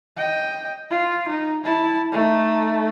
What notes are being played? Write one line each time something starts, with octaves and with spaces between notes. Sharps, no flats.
D#5 G5
F4
D#4
E4 A5
A3 D#4